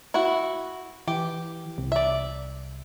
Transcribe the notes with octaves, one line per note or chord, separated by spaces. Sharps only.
E4 F#4
E3 G4
C2
D5 E5